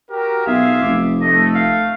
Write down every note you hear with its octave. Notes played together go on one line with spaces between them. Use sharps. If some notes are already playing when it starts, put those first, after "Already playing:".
F#4 G4 A#4
B1 F4 G#4 E5 F5
F1 D6
A3 D#5
F5